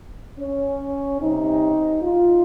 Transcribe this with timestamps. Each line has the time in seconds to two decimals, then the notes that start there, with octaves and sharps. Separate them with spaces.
0.40 C#4
1.21 C3 G3 D#4
2.03 F4